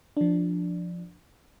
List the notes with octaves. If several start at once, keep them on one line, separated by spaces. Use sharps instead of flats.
F3 D4